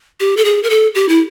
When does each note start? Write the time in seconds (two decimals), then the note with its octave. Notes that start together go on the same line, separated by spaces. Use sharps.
0.20 G4
0.37 A4
0.45 G#4
0.63 A#4
0.70 A4
0.95 G4
1.09 E4